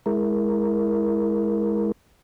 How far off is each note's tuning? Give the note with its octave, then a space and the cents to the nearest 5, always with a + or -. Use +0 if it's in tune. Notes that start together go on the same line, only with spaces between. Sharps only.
G#3 +0 E4 +0 A#4 +0